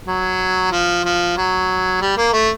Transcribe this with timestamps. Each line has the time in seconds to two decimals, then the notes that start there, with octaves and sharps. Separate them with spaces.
0.07 F#3
0.71 F3
1.05 F3
1.37 F#3
2.01 G3
2.17 A#3
2.33 A3